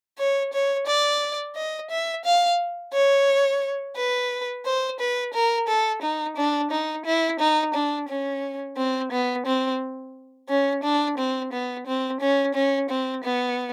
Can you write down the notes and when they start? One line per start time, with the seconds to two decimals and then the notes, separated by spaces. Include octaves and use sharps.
0.18 C#5
0.53 C#5
0.87 D5
1.56 D#5
1.90 E5
2.25 F5
2.93 C#5
3.96 B4
4.65 C5
5.00 B4
5.34 A#4
5.68 A4
6.02 D#4
6.37 D4
6.71 D#4
7.05 E4
7.39 D#4
7.74 D4
8.09 C#4
8.77 C4
9.12 B3
9.46 C4
10.49 C#4
10.83 D4
11.18 C4
11.53 B3
11.86 C4
12.21 C#4
12.55 C#4
12.90 C4
13.23 B3